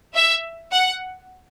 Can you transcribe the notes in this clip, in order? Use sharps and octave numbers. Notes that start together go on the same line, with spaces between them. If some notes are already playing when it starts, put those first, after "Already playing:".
E5
F#5